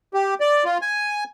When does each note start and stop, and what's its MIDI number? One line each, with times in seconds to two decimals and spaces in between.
0.14 0.34 67
0.40 0.64 74
0.65 0.78 65
0.82 1.24 80